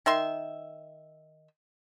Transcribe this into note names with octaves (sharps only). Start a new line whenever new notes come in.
D#3 E5 C6